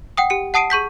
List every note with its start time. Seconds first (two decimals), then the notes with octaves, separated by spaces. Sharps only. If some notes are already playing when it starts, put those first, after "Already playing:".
0.17 F#5 G5 D#6
0.30 G4 C#7
0.54 F#5 A5 D#6 C7 D7 D#7
0.70 G#4 C#6 G6 B6